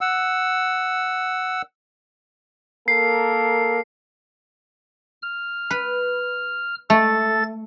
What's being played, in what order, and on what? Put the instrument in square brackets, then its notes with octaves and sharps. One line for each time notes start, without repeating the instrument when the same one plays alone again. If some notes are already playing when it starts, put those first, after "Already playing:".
[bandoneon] F#5 E6
[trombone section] A#3 A4 A#4 [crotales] C7
[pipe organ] F6
[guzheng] B4
[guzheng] A3 [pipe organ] A4 A6